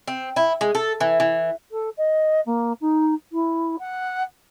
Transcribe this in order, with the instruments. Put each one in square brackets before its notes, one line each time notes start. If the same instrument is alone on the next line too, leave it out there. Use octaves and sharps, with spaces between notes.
[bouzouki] C4
E4
G#3
A4
E3
E3
[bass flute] A4
D#5
A#3
D#4
E4
F#5